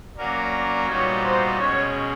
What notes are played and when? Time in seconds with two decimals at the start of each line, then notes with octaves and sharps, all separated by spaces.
0.17 F#3 A#3 C#4 F#4 A#4 D5
0.52 D5
0.87 A#2 G3 B3 D#4 F#4 C#5
1.22 C5
1.58 B2 G#3 C#4 C#5